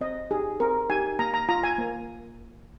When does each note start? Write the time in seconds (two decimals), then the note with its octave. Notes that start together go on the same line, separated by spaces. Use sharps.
0.01 C4 D#5
0.31 D#4 G4 G#4
0.60 C4 A#4
0.90 D#4 G4 G#5
1.19 A#3 A#5
1.34 A#5
1.49 F4 A#5
1.63 G#5
1.78 A#3